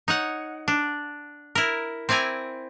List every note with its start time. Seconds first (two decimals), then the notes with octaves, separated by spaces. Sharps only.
0.08 D#4 C#5 F#5
0.68 D4
1.55 E4 A#4
2.09 C4 E4 D5 G#5 A#5